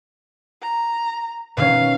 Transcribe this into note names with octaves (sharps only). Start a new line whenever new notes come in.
A#5
B2 D#3 C#4 F5